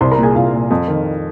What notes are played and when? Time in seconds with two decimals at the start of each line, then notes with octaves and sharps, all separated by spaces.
0.01 C2 C5 C6
0.12 A#4 A#5
0.17 A#2
0.23 G#4 G#5
0.35 C2 F4 F5
0.53 A#2
0.70 F2
0.88 D#3